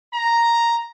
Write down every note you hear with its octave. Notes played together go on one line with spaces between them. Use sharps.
A#5